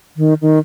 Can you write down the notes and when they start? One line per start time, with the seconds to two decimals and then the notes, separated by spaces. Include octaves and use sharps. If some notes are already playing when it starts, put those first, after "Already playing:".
0.17 D#3
0.42 D#3